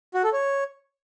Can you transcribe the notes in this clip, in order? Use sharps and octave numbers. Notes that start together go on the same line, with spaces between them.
F#4
A4
C#5